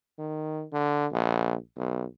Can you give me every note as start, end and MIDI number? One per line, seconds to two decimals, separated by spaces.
0.19 0.64 51
0.73 1.06 50
1.12 1.55 34
1.77 2.05 35